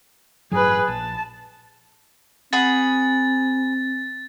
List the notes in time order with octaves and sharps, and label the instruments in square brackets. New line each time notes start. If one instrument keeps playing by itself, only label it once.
[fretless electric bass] A1 G2 F#3 [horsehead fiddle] G#4 B4
[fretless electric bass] A#1 [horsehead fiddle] A5
[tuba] C4 [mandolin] G#4 F#5 B5 [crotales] A6